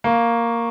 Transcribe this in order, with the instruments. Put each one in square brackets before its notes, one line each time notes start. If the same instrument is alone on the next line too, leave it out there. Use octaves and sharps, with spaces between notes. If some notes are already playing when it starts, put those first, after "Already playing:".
[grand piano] A#3 [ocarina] C#6